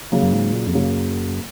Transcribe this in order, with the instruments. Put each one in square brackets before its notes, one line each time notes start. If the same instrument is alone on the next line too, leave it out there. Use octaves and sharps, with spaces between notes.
[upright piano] C#3 F#3 A#3
[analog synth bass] F#2
G#2
A#2
F2
[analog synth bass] F#2 [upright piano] C#3 F#3 A#3